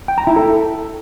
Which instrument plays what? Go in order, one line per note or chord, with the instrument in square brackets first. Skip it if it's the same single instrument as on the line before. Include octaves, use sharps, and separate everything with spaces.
[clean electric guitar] G5
A#5
E4
A4